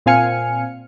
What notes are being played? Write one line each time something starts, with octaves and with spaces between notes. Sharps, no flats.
A#2 C4 F5 G#5 F6 C#7